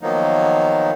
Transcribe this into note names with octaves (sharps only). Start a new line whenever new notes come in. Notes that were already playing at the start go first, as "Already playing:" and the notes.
D#3 F3 F#3 A#3 B3 D#4